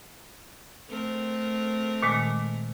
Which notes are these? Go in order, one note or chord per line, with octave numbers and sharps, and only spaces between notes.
A3 C4 A#4
A#2 D#3 G#3